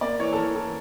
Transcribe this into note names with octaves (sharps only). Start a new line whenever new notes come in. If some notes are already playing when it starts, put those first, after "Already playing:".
A#3 D5
E3 C#5
A4
E3 A#4
E3 A4